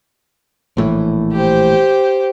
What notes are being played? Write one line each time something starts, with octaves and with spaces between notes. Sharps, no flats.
A#1 A2 E3
G4 C5